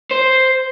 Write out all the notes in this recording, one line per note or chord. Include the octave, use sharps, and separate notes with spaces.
C5